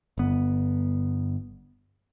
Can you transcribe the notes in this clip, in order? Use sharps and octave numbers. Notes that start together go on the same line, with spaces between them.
G1 B3